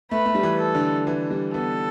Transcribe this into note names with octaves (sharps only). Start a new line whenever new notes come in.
A3 B4
A3
G3
E3
A4
D3
E3
G3
B3 A4